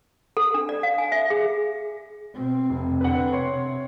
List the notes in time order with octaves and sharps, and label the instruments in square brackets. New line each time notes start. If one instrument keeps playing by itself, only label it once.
[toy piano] A4
D4
D5
F5
G#5
E5
G#4
[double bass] B2 C4
[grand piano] F1
[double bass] D3 C4 [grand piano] B4 F#5
[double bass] C3 [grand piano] C#5 C6